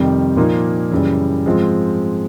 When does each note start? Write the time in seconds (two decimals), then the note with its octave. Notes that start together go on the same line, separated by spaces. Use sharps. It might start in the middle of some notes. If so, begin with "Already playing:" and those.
Already playing: F2 C3 D#3 G3
0.36 A#2 F3 A#3 D#4
0.91 F#2 C#3 E3 G3
1.46 G#2 F3 G#3 C4 F4